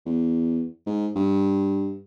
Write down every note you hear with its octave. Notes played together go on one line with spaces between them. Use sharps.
E2
G#2
G2